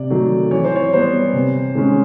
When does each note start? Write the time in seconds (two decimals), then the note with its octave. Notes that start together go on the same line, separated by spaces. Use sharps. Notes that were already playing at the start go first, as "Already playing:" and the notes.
Already playing: C3 D5
0.10 D#3 F#3 A3
0.51 E3 C#5
0.64 C5
0.76 C#5
0.93 G3 B3 C5
1.33 C3
1.75 D#3 G#3 C#4